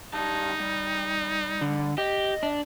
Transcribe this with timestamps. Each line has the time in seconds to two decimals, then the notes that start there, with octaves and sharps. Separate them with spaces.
0.14 G3 D#4 A5
0.60 G3
1.61 D3
1.98 G4 D#5
2.43 D4